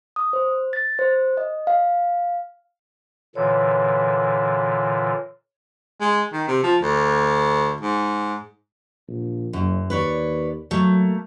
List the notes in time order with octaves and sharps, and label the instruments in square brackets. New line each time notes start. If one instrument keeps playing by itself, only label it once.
[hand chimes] D#6
C5
A6
C5
D#5
F5
[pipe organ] A#2 D3 E3 [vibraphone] C#5
[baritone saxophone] G#3
D#3
C3
F3
D2
G#2
[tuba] A#1
[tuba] F#1 [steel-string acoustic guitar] F#2
[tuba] D#2 [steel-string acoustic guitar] B4 C#5 D5
[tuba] F#3 [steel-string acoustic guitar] A3 A#3